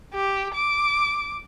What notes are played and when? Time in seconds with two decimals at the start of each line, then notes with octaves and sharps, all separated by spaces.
0.15 G4
0.54 D6